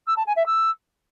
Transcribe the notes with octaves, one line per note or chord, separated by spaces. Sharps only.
E6
A5
G#5
E5
E6